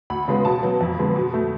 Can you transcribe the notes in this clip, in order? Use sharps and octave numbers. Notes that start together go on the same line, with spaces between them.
D2 B5
C#3 G#3 B3
B2 A5
F#3 B3
F2
D3 G#3 B3
B2
A3